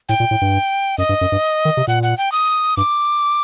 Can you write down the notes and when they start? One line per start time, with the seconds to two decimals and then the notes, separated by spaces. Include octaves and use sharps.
0.09 A2 G5
0.20 A#2
0.31 A2
0.41 G2
0.98 F#2 D#5
1.09 G2
1.21 F#2
1.32 G2
1.65 D#3
1.77 C3
1.87 A#2 F#5
2.03 F#5
2.17 G5
2.32 D#6
2.77 G2 D6